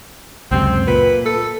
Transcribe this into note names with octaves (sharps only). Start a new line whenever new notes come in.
C#2 F#2 C3 C4
A#2 B4
A4